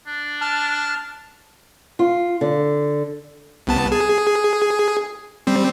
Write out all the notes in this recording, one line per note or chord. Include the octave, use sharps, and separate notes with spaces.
D4
A5 F6
F4
D3
C2 B3 A5
G#4
G3 C4